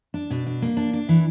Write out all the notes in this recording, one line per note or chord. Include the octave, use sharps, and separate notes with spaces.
D4
B2
D4
A#3
D4
D4
E3